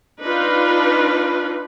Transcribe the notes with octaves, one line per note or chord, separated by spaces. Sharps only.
D4 D#4 F4 B4